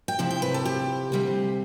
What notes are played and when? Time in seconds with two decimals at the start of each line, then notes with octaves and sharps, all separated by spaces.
0.08 G5
0.19 C3 F3 C4 E4
0.31 G5
0.42 B4
0.54 A4
0.65 G4
1.12 D2 C3 G3 C4